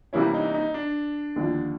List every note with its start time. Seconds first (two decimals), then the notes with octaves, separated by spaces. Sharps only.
0.13 C3 E3 G3 A#3 C#4 E4
0.34 D#4
0.54 D#4
0.74 D4
1.36 D#2 D3 F3